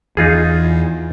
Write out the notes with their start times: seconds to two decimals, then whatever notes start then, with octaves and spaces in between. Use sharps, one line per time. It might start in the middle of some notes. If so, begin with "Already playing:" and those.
0.17 E2 D#4 F4 G#4